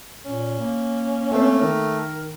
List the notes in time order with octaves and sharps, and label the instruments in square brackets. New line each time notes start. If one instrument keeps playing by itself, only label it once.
[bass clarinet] A#2 [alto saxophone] C#4
[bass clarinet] A#3
[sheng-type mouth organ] A3 [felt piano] C4 C5
[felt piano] D#3 [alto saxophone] A#4